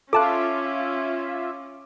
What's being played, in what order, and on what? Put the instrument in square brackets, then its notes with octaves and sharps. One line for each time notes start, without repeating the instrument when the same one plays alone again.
[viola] C#4 [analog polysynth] F4 E5 [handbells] A4 A5 F#6 [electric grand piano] D6